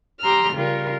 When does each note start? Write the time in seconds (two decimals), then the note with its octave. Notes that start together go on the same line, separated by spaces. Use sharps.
0.21 G4 A#5 C6 E6 F6
0.54 C#3 G3 F4 A#4